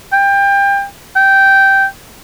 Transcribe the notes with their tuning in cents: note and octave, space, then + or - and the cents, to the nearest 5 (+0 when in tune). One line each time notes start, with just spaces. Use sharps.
G5 +25
G5 -10